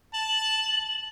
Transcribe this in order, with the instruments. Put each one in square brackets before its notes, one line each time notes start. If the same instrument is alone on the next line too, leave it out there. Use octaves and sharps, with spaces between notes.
[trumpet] A5 [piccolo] F#7